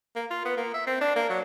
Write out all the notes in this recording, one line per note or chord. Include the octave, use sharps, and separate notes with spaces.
A#3
F4
B3
A#3
E5
C4
D4
A#3
F#3